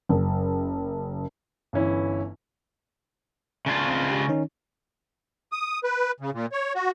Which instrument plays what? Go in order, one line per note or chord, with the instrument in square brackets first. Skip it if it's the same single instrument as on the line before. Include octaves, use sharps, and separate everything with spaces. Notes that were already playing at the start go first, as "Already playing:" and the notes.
[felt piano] F#1
[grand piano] G1 E3 C#4 E4
[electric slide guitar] C#3 D4 F4
[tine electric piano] C4
G4
D#3 C#4 D#4
[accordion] D#6
B4
C#3
A#2
C#5
F#4